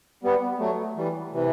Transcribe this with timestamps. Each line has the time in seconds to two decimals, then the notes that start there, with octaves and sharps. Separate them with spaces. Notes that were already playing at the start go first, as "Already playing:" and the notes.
0.23 G3 B3
0.60 F#3 A3
0.97 E3 G3
1.32 C3 E3